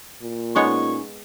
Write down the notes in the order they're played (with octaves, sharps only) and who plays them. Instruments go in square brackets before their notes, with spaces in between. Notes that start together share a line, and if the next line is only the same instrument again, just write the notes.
[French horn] A#2
[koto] G#3 B3 C#5 [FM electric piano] C#4 D#4 G#5 [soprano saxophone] C#6